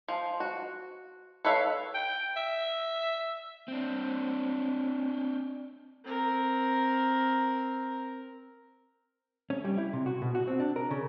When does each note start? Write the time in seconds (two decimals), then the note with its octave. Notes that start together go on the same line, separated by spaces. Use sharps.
0.08 F3
0.40 F#4
1.45 A4 B4 C#5 E5 F5
1.94 G5
2.37 E5
3.68 C4 D4
6.05 C4 A#4
9.50 C#4
9.64 G3
9.78 E4
9.93 C3
10.06 F#4
10.22 B2
10.35 F#4
10.47 C4
10.60 D4
10.76 A#4
10.91 C#3